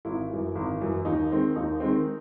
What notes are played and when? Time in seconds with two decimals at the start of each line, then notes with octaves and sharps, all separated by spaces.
0.05 G#1 E4
0.29 F#2 E3
0.55 G#1
0.80 F#2 E3
1.05 D#2 D#4
1.31 D#3 G#3 C4
1.56 D#2 D#4
1.80 D#3 G#3 C4